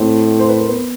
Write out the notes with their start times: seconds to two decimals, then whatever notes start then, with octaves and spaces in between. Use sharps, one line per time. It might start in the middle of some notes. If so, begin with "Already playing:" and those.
Already playing: A2 C4
0.39 C5
0.49 B4
0.58 A#4
0.68 B3 B4